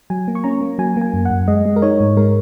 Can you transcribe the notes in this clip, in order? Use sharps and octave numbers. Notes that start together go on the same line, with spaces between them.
F#3 G#5
A#3
C#6
C#4 A#5
A#3
F#3 G#5
A#3 G#5
F#2
F#2 F#5
G#3 D#5
G#3
A#4
D#4 C#5
G#2
G#3 A#4